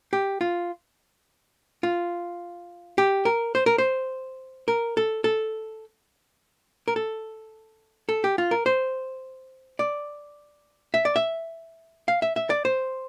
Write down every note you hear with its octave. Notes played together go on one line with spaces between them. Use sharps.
G4
F4
F4
G4
A#4
C5
A#4
C5
A#4
A4
A4
A#4
A4
A4
G4
F4
A#4
C5
D5
E5
D5
E5
F5
E5
E5
D5
C5